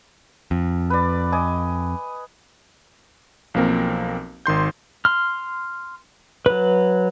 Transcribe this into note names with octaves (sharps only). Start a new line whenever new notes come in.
F2
B4 D5
D#5 G#5 D6
B1 F3 A#3 C4 A#4
G#1 D#3 C6 G6
C6 F6
F#3 B4